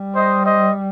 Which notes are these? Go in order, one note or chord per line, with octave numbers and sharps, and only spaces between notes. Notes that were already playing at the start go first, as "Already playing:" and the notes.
Already playing: G3
C5 D#5
C5 D#5